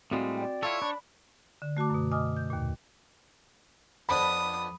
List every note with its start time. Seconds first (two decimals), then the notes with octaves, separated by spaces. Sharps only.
0.11 A2 G3 G#3 C4 F#4 F5
0.38 D5 G5
0.63 E4 F4 A4 C#5
0.82 D4 D5 B5
1.62 D3
1.77 A3 F#4 A5 D6
1.90 F#2 B2
2.11 D#5 G#5 D6 D#6 F6
2.36 G6
2.50 D#2 A#2
4.09 F2 B3 D4 B5 D#6